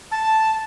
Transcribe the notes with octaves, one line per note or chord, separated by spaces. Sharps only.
A5